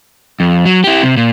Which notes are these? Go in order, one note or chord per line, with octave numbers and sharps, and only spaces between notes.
F2
F#3
E4 G4
C3
A#2